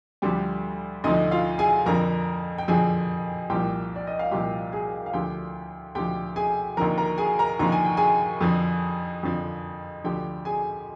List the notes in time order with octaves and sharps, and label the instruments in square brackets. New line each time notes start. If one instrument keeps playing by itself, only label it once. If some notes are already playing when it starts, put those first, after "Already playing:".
[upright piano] D2 D3 F3 G3 G4
D2 D3 F3 D#4 D#5
F4 F5
G#4 G#5
F2 D3 F3 A#4 A#5
G5
F2 D3 F3 G#4 G#5
C2 A#2 F3 G4 G5
D5
D#5
F5
C2 A#2 F3 G4 G5
G#4 G#5
F5
D2 D3 F3 G4 G5
D2 D3 F3 G4 G5
G#4 G#5
D#2 D3 F3 A#4 A#5
A#4 A#5
G#4 G#5
A#4 A#5
D#2 D3 F3 A#5
G#5
G5
G#4 G#5
F2 D3 F3
F2 D3 F3
D2 D3 F3 G4 G5
G#4 G#5